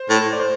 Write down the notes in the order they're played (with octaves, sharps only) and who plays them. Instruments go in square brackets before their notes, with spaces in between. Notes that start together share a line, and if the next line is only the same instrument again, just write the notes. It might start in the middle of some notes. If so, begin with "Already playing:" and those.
Already playing: [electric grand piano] C5
[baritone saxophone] A2
[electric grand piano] D5
C5